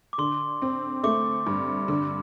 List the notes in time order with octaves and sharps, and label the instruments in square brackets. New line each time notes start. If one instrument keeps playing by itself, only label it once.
[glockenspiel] D6
[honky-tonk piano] D3 [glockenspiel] C6
[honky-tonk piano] C4
[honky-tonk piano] A3 [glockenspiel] D6
[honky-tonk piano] G2
D3